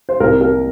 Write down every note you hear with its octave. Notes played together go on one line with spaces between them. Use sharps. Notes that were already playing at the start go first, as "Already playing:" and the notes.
C5
C2 A#4
A#3 A#4